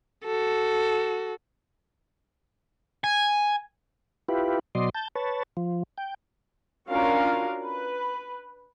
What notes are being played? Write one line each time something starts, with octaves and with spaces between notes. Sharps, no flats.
F#4 A4
G#5
E4 F4 G4 B4
B2 F#3 D5 D#5 C6
A5 G6
B4 C#5 A5
F3
G5
C#4 D4 F4 F#4 A#4 F5
B4